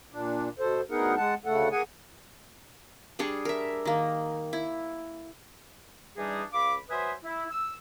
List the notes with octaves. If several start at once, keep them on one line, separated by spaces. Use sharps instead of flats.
A#2 D4
B2 A4 C5
D2 B3 D#4 G#4 A#4 F#5
G#3 F#5 A5
D2 C#3 A3 A4 F#5
A#3 G#4 F#5 G#5
G3 D4 G#4 C#6
A#4 E5
D#3 A#3
E4
E3 G3 D4 D#4 G#4
C#2 F5 B5 D6
F#3 B4 C5 E5 G#5 D#6
E4
E6